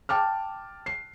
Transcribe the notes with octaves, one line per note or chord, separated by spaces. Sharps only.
G5 A5 D6 F6
C7